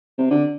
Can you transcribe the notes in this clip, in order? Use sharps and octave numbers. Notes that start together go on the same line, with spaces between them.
C3
D3